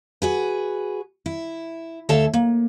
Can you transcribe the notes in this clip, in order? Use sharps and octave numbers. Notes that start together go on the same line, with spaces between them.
F#4 G#4 B4
E4
D2 A4 C#5 E5 F5 A5
A#3